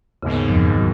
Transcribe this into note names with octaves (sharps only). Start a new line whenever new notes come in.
D#2 G#2 C#3 B3
F2
F#3